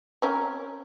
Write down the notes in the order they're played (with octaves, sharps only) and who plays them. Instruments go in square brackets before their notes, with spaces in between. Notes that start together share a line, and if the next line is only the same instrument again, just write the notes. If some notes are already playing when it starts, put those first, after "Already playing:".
[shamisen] C4 C#4 A#4